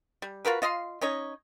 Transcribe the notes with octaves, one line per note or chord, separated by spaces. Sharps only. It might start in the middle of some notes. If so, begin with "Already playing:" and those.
G3
F4 F#4 A#4 B4
F4 D#5 F5 C6
C#4 D#4 C#5 D#5